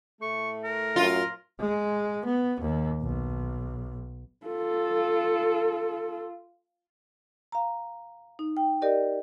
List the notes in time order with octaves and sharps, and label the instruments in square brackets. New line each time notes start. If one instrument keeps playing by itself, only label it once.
[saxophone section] A2 A3 [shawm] C#6
[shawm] A#4
[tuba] F#2 [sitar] F4
[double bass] G#3
B3
D#2
B1
[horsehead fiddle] F4 A4
[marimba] F5 A#5
D#4
G5
G4 A#4 D5 D#5